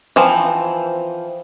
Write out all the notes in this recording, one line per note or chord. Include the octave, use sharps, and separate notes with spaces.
E3 F3 C4